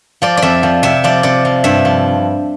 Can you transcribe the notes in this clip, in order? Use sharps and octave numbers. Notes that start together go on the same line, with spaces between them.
F3 D5
D5
F2 E5
F3
C3 E5
F3 D5
C3 D5
F3
G2 E5
F3